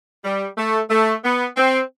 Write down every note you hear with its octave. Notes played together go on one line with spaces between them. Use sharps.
G3
A3
A3
B3
C4